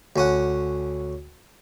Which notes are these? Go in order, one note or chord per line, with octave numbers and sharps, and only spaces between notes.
D2 C#4 F#5